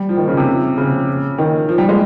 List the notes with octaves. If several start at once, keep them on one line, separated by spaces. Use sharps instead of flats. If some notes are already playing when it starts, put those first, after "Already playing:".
Already playing: G3
F3
D#3
C#3
C3
C#3
D#3
F3
G3
G#3